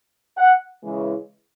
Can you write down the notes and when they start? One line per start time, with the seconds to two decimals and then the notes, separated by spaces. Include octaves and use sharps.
0.37 F#5
0.82 C#3 E3 G#3